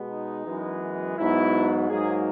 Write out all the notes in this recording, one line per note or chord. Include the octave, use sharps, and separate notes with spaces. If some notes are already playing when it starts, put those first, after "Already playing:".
Already playing: B2 G#3 B3
D#4
F#2 E3 G#3 B3
G#2 F#3 B3 E4
G#2 F#3 A#3 G#4